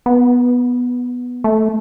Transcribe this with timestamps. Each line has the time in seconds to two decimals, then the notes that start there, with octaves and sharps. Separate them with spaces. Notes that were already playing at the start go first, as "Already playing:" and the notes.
0.06 B3
1.44 A3